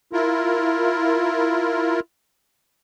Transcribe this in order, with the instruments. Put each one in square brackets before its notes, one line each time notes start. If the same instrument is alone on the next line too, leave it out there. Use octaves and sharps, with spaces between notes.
[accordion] E4 F4 A#4